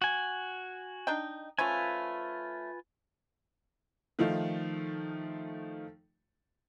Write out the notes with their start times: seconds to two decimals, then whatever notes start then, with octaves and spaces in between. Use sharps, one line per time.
0.02 F#4 G#5
1.07 D4 D#4 G5
1.59 F3 A3 C#4 F4 B4 G#5
4.19 D#3 F3 A3 D#4 F4